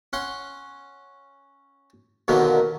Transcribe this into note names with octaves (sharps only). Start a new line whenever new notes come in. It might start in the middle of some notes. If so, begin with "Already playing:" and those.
C#4 F#5 C6
D#2 B2 D3 D#3 F#3 A#3